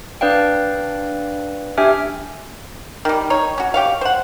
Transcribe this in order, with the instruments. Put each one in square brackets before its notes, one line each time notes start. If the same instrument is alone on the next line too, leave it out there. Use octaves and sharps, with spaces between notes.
[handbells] D4 B4 D5 F5 G5
D4 G4 E5 G5 G#5 F6
[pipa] D#3 G3
D#4 C#5
C#4 F#4
G4 C#5 F5
C5 F#5